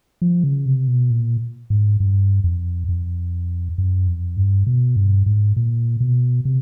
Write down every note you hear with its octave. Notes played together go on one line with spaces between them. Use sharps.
F3
C#3
C3
B2
A#2
G#2
G2
F2
F2
F#2
F2
G2
B2
G2
G#2
A#2
B2
C3